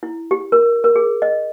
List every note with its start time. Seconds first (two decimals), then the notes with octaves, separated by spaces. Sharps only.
0.03 E4
0.31 G4
0.52 A#4
0.84 A#4
0.96 G#4
1.22 D#5